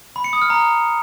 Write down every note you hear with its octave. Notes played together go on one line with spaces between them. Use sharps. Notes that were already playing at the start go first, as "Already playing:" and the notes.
B5
C#7
D#6
F6
A#5